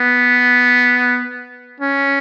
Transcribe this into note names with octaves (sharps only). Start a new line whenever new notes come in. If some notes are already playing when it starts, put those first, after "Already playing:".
Already playing: B3
C#4